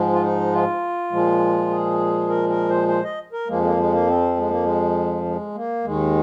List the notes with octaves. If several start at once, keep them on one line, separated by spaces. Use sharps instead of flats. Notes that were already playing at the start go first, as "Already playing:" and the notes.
Already playing: G#2 F3 G#3
F4
D#4
F4
A#2 F3 G#3
G#4
A#4
A#4
C5
C5
D#5
A#4
F2 F3 G#3 A#3
A#3
G#3
A#3
C4
G#3
A#3
G#3
G#3
A#3
D#2 D#3 G#3